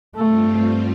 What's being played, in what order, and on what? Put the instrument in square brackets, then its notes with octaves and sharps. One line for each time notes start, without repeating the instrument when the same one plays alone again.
[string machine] G2 G3 C4 F4 [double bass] A3